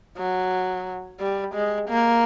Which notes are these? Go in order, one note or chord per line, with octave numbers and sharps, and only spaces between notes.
F#3
G3
G#3
A#3